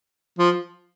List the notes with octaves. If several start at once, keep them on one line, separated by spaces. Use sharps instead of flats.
F3